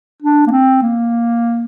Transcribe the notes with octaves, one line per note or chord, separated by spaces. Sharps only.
D4
A#3
C4
A#3